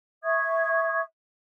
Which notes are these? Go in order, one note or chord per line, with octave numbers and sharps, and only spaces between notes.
E5 C#6 D#6 G#6